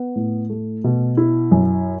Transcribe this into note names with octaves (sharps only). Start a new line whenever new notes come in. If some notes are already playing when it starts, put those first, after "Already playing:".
Already playing: B3
A2
A3
B2
E4
F#2